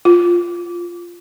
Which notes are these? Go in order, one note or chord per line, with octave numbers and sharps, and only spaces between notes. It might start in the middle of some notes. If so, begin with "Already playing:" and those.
F4